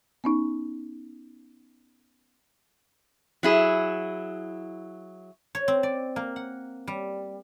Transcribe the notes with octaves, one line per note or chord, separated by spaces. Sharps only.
B3 C#4 D#4
F#3 E4 G#4
C#5
C4
D5
A#3
F#5
G3